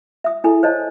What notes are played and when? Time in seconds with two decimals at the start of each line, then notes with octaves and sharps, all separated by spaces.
0.24 E5 D#6
0.44 E4 G#4 A4 G#5
0.63 C5 C#5 D#5 A5